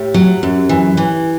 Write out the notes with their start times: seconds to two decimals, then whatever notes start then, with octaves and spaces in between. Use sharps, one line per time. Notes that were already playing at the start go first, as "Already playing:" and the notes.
Already playing: A2 G4
0.14 F#3
0.43 F#2
0.69 E3
0.97 E3